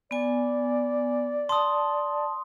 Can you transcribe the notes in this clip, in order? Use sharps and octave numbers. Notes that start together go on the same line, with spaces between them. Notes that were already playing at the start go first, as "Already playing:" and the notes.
B3 D5 G#5
A5 C6 D#6